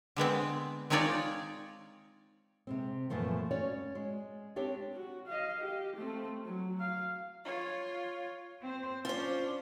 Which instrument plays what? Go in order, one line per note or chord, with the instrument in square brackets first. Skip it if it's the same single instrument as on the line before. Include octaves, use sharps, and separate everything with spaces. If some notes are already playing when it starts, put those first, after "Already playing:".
[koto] D3 G#3 B3 C4
G#3 C4 D#4 F4 C#5 D5
[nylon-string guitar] C3 G#3 C4
F#2 A#2 E3 F3 A3 A#3
C#4 F#4 C#5 D5
G#3
C4 D4 G4 C#5
[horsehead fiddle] F#4
D#5 F5
G4
A3 C4
F#3
F5
F4 C#5
[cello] C4 C5
[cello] C#4 D4 [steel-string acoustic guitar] F4 C5